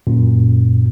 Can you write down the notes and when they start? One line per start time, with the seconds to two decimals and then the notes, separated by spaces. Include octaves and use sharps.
0.07 F#2 A#2